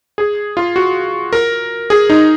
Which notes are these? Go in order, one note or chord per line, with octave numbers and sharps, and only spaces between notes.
G#4
F4
F#4
A#4
G#4
D#4